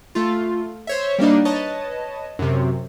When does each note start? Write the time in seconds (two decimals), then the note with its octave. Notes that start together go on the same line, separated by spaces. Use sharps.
0.15 A3 F4
0.87 C5 C#5 E5
1.19 G3 A#3 D4 D#4
1.45 B4 C#5 D#5 A5
2.39 F#2 C3